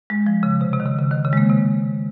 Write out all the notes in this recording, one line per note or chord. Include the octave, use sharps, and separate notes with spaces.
G#3
F3
C#3
C3
C3
D#3
C#3
C#3
D#3
C#3
G#3
A#3
C3